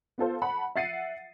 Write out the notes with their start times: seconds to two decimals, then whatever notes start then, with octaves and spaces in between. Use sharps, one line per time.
0.18 B3 F4 A4 C5
0.42 F#5 A5 B5
0.75 E5 F#5 A6 C7 C#7 D#7